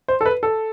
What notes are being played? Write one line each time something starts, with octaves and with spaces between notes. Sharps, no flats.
C5
A4
B4
A4